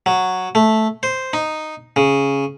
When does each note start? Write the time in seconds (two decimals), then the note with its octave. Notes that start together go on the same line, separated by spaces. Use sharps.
0.06 F#3
0.55 A3
1.03 C5
1.33 D#4
1.96 C#3